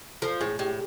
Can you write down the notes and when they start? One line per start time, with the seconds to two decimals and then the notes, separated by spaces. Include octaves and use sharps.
0.22 F3 A4
0.41 A2 G#4
0.59 A2 G4